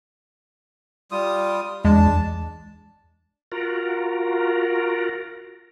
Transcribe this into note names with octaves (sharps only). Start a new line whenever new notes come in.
G3 F4 D#6
E2 G#3 D4 A5
F4 F#4 A#4